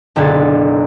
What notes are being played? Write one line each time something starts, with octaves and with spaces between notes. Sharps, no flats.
F#1 B1 D3 G#6 A6